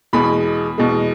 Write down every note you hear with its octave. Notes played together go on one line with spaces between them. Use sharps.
E2 B2 G#3 B5
E2 B2 G#3